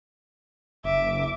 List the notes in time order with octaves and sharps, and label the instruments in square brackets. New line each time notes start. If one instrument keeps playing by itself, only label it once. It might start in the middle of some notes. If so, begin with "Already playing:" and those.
[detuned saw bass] F#1 [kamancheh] E5 D6